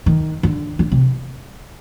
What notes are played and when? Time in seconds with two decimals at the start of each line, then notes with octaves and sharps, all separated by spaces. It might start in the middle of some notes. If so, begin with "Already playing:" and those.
0.06 D#3
0.43 D3
0.79 D3
0.92 C3